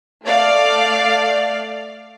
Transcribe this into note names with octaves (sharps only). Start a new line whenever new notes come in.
A3 D5 F5